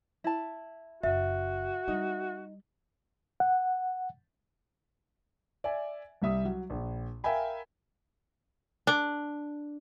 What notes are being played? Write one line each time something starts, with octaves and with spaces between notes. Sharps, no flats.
E4 A5
F#1 F#4 E5
G3 D#4
F#5
D5 E5 G#5
C2 G3 E5 D#6
F#3
A#1
A#4 E5 F5 G5 G#5 B5
D4